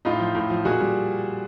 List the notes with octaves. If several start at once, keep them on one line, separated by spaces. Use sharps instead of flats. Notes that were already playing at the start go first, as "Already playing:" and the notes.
A2 D#4 F4
F3
A2
F3
A#2 F#4 G#4
G3